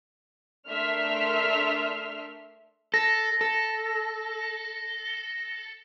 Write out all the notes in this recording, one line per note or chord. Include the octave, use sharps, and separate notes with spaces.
A3 D4 A#4 E5 C6 F6
A4 A#6
A4